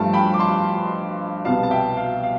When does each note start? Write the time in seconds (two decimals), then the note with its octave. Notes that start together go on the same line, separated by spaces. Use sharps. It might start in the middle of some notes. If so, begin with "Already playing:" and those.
Already playing: G2 F3 A3 F5 A5
0.13 G5 B5
0.34 D6
0.39 A5 C6
1.45 C2 B2 B3 F5 A5
1.63 A5
1.71 E5 G5
1.97 F5
2.24 F5